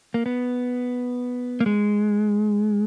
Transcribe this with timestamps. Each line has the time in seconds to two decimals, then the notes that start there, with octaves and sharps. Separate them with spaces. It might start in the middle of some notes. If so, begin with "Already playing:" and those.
0.14 A#3
0.26 B3
1.60 A#3
1.66 G#3